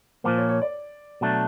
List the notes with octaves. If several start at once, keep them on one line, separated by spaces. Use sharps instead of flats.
A#2 F3 A#3 C5
C#5
C#5
D5
B2 F#3 A3 D4